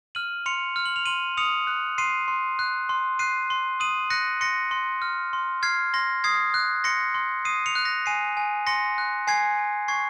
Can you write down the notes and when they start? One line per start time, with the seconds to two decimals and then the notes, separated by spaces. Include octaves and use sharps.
0.15 F6 D#7 F#7
0.46 C6 C#7 F7
0.76 F6
0.85 F#7
0.96 F7
1.06 C6 D#7 F#7
1.37 D#6 C#7 F7
1.67 F#6
1.98 C6 C7 D#7
2.28 C6
2.59 F#6
2.89 C6
3.19 F#6 C7 D#7
3.50 C6
3.80 D#6 D#7 F#7
4.10 F#6 A#6 C#7
4.41 C6 A#6 C#7
4.71 C6
5.02 F6
5.33 C6
5.63 F6 G#6 C7
5.94 C6 A#6
6.24 D#6 G#6 C7
6.54 F#6
6.84 C6 A#6 C#7
7.14 C6
7.45 D#6 C7 D#7
7.66 C#7 F7
7.75 F#6
7.85 A#6
8.06 G#5 C7 D#7
8.37 G#5
8.67 C6 A#6 C#7
8.98 F#6
9.27 G#5 G#6 C7
9.58 G#5
9.88 C#6 G#6 C7